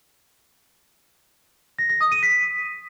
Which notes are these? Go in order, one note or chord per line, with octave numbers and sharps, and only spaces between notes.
A#6
A#6
D#6
D#7
B6